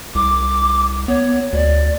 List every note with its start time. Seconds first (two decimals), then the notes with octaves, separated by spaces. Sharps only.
0.15 C2 D6
1.08 B3 C#5
1.53 D2 D5